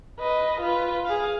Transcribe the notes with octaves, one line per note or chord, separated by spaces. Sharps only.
B4 D#5
F4 B4
G#4 F5